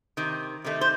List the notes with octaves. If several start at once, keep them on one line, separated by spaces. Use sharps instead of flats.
C3 D#3
C3 D#3 A3
C5